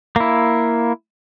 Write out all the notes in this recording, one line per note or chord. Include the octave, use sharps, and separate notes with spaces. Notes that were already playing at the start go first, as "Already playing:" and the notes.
A#3 E4